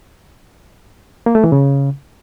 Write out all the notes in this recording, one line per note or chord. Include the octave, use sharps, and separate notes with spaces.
A#3
A3
E3
C#3